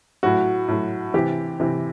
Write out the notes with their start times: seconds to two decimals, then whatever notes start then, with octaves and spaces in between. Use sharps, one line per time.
0.23 A2 F#3 F#4
0.68 A2 F#3
1.14 C3 E3 G4
1.60 C3 E3